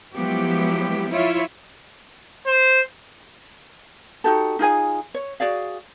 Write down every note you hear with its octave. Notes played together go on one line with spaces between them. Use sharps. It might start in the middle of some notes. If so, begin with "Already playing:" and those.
F3 F#3 G#3 B3 E4 G4
E4 F4 C#5 E5
C5
D#4 F#4 G4 A4
D#4 F4 G#4 G#5
C#5
F#4 G#4 D5 F5